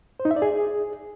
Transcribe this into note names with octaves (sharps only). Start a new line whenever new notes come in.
C5
D#4
E5
D5
G#4